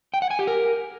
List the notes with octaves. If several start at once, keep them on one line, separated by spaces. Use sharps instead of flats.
G5
F#5
G#5
G4
A#4